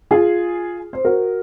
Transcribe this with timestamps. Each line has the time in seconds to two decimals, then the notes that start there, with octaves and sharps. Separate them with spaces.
0.11 F4 G#4
0.93 C5
1.05 F#4 A#4